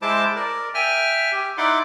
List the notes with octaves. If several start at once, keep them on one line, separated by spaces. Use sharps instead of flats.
G#3 E4 C5 A5 D6
A#4 D5
E5 G5 G#5 F6
G4
D#4 E4 D5 F#5 C6 D6